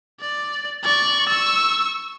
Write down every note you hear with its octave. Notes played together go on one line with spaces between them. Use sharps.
D5
D5 C#6
C#6 E6